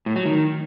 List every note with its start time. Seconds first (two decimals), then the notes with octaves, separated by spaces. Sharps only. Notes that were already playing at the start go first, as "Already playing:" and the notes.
0.06 A2
0.16 F#3
0.26 D#3